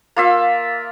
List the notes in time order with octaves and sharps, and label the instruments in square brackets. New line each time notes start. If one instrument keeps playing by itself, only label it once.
[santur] A#3 F4 E5